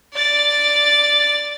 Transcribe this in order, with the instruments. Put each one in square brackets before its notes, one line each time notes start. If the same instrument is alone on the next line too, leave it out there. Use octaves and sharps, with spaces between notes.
[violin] D5 A6